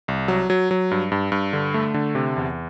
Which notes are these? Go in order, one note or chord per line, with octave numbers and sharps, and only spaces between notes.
C2
F#3
F#3
F#3
G2
G2
G2
D3
A3
D3
C3
E2